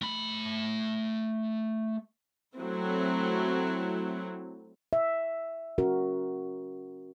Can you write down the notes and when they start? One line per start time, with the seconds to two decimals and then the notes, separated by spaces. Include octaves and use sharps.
0.02 A3 B5
2.57 F#3 A3 C4 E4
4.93 E5
5.78 C#4 F#4 A#4